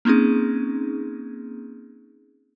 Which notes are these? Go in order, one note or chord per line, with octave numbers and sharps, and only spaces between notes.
A#3 C4 C#4 D#4 G#4